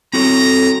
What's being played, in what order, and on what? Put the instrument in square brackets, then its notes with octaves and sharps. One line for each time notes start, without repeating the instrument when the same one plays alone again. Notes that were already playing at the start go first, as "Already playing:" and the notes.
[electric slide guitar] C4 F#4 A4 [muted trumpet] A#5